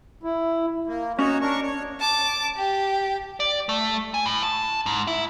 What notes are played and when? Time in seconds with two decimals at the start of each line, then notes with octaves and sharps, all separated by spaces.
0.23 E4
0.87 A#3
1.19 C#4 D#4 F#4 C#5
1.41 D4 A#4 C#6
1.63 C#5
2.00 A5 D6
2.56 G4
3.40 D5
3.69 A3
4.14 G#5
4.26 A2
4.43 A5
4.86 G#2
5.07 E4